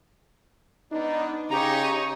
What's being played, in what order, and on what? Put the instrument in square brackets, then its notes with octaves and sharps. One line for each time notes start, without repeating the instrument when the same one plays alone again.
[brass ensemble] G#2 B3 D4 [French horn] D#4
[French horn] C#3 [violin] D#4 C#5 [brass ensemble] G4 [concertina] A#5